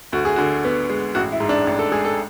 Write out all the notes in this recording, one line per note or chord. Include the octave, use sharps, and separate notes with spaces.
D2 F#4
G#4
D3 F#4
B3
G#3
A1 F#4
E4
G#2
D4
A1
A4
G#3 G#4
A4